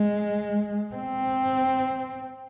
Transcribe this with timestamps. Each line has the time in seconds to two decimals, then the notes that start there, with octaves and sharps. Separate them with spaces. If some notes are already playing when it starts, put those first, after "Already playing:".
Already playing: G#3
0.96 C4